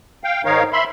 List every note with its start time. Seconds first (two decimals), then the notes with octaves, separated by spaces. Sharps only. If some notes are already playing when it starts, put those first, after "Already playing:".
0.24 F5 G5
0.45 G#2 D#3 D#4 A#4 C#5 F5
0.73 E5 B5 C6